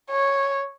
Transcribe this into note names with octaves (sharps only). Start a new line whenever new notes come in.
C#5